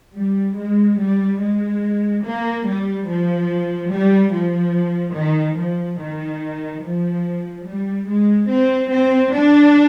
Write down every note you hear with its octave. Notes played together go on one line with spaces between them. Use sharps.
G3
G#3
G3
G#3
A#3
G3
F3
G3
F3
D#3
F3
D#3
F3
G3
G#3
C4
C4
D4